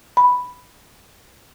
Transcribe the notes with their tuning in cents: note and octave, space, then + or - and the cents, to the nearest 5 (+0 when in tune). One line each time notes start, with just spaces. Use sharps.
B5 +0